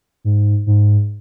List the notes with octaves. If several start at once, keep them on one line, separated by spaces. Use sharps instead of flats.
G#2
G#2